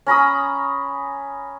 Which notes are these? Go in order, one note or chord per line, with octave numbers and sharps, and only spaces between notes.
C#4 A#5 B5 D#6